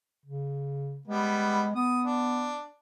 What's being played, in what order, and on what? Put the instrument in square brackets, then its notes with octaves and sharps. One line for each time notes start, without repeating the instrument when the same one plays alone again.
[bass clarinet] C#3
[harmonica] G3 B3 [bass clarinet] G#3
[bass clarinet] B3 [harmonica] D#6
[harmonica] D4